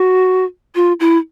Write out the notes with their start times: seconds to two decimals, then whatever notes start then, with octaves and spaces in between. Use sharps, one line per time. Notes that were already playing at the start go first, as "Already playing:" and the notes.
Already playing: F#4
0.75 F4
1.00 E4